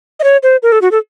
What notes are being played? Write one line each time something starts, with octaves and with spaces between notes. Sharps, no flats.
D#5
C#5
C5
A#4
A4
F#4
A4